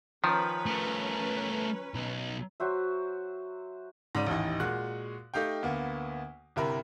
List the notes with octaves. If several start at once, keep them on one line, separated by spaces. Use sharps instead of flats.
D#3 F3 C#4 B4 A#5
A3 A#4
B1
F#3 F#4 C5 E5
G#2 C#3 D5 D#7
A1 D#2 E3 D#4
A#2 G#3 F#4 F#6
A3 D#4 G4 F5 G5
D2 A#3 B3
G1 C3 E4 A#4 B5